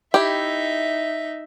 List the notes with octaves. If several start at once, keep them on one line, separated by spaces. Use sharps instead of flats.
D#4 E4 G4 E5